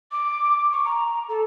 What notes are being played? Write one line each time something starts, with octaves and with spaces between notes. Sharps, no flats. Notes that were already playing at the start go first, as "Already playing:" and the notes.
D6
C#6
A#5
A4